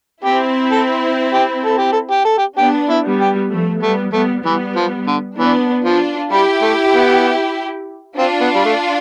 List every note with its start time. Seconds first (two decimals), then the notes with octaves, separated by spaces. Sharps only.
0.24 C4 E4 G4
0.72 A4
1.34 G4
1.65 A4
1.78 G4
1.92 A4
2.11 G4
2.25 A4
2.38 G4
2.58 B3 D4 G4
2.89 E4
3.05 G3 B3
3.21 G4
3.51 F3 A3
3.82 G3 A3 B3
4.13 G3 A3 B3
4.44 E3 G3 B3
4.76 F3
5.07 D3
5.38 E3 B3 D4
5.84 F3 D4 F4
6.31 G3 E4 G4
6.62 A3
6.94 B3
8.18 C4 D4 F4
8.41 B3
8.55 G3
8.65 A3